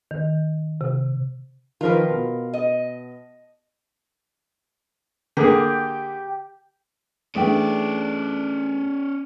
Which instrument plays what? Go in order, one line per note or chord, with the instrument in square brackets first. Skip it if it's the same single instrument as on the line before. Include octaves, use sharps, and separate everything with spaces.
[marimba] D#3
C3
[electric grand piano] D#3 F3 [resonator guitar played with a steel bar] F4 A#4 B4
[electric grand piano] B2
[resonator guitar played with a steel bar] D#5
[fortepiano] D3 A#3 G#4 [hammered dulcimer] G4
[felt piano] E3 A3 D4 [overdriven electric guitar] C#4 D5 [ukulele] G#4 E5 G5